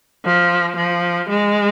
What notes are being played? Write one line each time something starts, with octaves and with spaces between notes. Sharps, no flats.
F3
F3
G#3